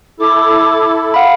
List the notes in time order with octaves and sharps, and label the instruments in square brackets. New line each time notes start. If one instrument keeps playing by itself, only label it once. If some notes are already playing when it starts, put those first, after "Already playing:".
[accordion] E4 A4 [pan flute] D6
[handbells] F5 B5 [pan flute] F#5